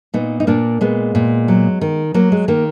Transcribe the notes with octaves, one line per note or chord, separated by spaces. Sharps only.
A#2 B3 D#4
D#4
A#2 A#3 D4
A#2 G#3 B3
A#2
F#3
D#3
F#3 A#3
G#3
D#3 A#3